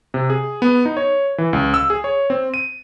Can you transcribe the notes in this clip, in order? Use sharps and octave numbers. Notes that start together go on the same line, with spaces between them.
C3
G#4
B3
D#4
C#5
E3
C#2
E6
G#4
C#5
C4
D#7